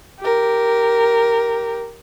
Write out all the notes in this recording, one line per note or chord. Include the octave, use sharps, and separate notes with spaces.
G4 A#4